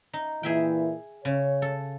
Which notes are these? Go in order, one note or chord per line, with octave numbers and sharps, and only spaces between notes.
D#4
A#2 E3 E4 G#4 E5 G5
C#3 C#5
A4